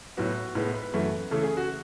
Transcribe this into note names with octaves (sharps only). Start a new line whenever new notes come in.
A2 F#3 B3 F#4
A2 G#3 B3
B4
F#2 E3 A3
C#3 E3 A3 A4
G#4
F#4